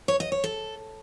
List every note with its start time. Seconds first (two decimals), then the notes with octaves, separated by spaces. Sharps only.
0.08 C#5
0.20 D#5
0.32 C#5
0.44 A4